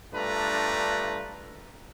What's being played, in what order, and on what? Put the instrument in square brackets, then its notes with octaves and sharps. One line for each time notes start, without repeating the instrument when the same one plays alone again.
[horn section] G2 A3 D4 F4 B4 A#5